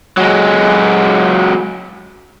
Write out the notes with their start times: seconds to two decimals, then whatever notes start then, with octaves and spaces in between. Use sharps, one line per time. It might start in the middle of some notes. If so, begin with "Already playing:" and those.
0.17 F#3 G#3